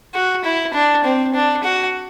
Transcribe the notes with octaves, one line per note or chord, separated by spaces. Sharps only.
F#4
E4
D4
C4
D4
F#4